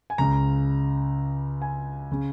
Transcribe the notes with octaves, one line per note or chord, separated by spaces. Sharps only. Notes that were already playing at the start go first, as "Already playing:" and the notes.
G#5
C#2 C#3 A#5
G#5
C#3